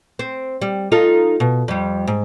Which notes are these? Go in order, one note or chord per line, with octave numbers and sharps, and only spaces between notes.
C4
G3
D#4 F4 A4
B2
F2 G3
G#2